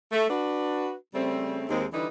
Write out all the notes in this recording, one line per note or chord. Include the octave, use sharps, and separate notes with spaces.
A3
D4 F#4 B4
C#3 G3 A3 C4
D#2 G#3 C4
D3 E3 G3 D#4 E4 B4